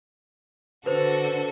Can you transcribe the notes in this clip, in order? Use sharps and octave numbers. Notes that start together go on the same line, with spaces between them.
D3 F#4 A4 B4 C5